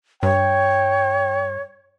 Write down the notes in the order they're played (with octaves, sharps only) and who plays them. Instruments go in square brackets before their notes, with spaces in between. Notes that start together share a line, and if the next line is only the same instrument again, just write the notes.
[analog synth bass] G2 [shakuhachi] C#5 [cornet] G5